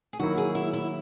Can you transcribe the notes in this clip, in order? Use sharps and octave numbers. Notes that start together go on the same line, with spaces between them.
G#4
D#3 F#3 A#3 E4 F#4
G#4
E4
E4